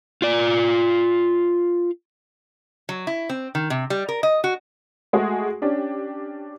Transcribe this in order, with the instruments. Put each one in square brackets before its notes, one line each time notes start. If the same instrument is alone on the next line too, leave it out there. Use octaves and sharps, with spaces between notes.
[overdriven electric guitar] F4 D5
[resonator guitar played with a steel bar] F#3
E4
C4
D#3
C3
G3
A#4
D#5
F#4
[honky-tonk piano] G#3 A3 F#4 G#4
C#4 D4 G4